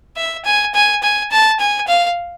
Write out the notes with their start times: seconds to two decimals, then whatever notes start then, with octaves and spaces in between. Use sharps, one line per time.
0.17 E5
0.45 G#5
0.74 G#5
1.03 G#5
1.32 A5
1.60 G#5
1.88 F5